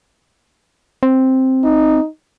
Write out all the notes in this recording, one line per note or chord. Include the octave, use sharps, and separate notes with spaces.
C4
D#4